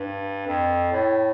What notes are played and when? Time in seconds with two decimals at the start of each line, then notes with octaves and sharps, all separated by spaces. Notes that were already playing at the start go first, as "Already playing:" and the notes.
Already playing: G2
0.47 F2
0.92 A2